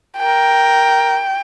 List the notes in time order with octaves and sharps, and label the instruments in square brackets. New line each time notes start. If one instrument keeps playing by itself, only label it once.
[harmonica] A#4 [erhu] G5